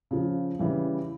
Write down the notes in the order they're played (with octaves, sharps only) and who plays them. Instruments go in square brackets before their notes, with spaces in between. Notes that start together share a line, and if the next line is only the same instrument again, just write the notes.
[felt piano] C#3 F3
C#3 E3 G3